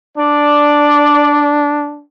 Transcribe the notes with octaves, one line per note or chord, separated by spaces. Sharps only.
D4 D5